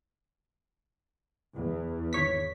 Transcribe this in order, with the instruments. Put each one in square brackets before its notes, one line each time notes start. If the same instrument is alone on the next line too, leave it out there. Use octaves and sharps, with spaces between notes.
[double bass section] E2
[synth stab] G#1 C#5 B6